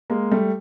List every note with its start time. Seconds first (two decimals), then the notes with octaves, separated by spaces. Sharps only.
0.10 G#3 A#3
0.31 G3 A3